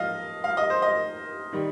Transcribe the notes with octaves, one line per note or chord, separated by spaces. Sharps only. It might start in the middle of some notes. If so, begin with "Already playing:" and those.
Already playing: F3 D#5 F5
F5
D#5
C5
D#5
D#3 G3